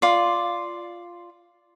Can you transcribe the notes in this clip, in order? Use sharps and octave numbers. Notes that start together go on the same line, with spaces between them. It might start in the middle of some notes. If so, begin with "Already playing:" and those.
F4 D5